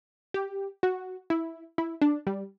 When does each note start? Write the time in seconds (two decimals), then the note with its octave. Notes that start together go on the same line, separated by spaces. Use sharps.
0.34 G4
0.83 F#4
1.30 E4
1.78 E4
2.02 D4
2.27 G3